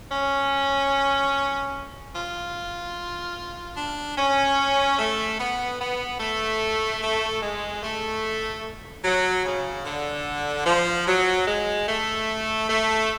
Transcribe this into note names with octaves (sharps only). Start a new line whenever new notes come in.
C#4
F4
D4
C#4
A3
B3
B3
A3
A3
G#3
A3
F#3
C#3
D3
F3
F#3
G#3
A3
A3